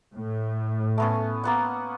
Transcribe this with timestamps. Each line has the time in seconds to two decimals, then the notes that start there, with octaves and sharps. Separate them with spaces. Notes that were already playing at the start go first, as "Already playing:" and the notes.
0.14 A2
0.98 A3 B3 C#4
1.44 A#3 B3 F#5